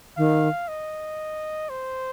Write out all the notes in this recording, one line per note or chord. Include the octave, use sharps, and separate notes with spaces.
D#3 F5
D#5
C5